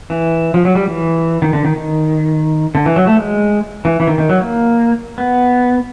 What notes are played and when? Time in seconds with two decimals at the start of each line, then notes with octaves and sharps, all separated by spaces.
0.10 E3
0.54 F3
0.65 F#3
0.75 G3
0.88 E3
1.42 D#3
1.53 D3
1.65 D#3
1.76 D#3
2.75 D3
2.86 E3
2.96 F#3
3.07 A3
3.19 G#3
3.85 E3
4.00 E3
4.07 D#3
4.18 D#3
4.29 F#3
4.41 A#3
5.18 B3